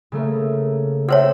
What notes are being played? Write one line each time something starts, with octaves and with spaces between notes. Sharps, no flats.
C#3 A3 A#3
C4 A4 C5 C#5 E5 E7